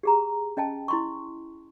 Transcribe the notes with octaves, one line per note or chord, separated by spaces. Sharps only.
G4 G#4 A#5
C#4 D#5 G5 A5
E4 C6 C#6